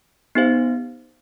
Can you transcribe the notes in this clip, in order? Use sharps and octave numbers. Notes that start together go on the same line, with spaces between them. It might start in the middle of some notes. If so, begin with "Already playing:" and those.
B3 D#4 G4 C5 F5